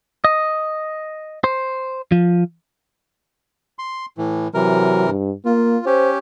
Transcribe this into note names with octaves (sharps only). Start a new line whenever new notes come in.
D#5
C5
F3
C6
A2 E3
C3 E3 F#3 A#4
G2
A#3 F4
C#4 G4 C5